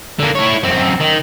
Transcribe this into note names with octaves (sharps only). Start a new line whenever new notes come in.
D3 A#3
E4 C#5
F#2 C4
D#3